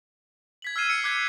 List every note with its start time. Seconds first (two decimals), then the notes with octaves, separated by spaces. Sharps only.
0.62 G#6 B6 F#7
0.76 E6 F6 G#6 C7 D#7 E7
0.87 B6 C#7
1.04 D6 F#6 G#6 C7 C#7